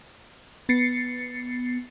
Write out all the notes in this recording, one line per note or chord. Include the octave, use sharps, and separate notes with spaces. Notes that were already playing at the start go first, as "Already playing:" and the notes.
B3 A6 C7 C#7